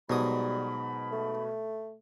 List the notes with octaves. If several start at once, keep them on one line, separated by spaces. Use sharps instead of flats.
G#2 B2 F#3 G3 B5 D#6
A3